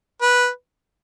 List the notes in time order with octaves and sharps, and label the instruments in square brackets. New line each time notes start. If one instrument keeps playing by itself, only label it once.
[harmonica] B4